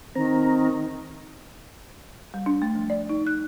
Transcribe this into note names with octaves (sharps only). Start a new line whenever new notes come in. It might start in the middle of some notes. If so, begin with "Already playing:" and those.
D#3 C4 A#5
G3
D4
A3
F3
D5
D#4
F#6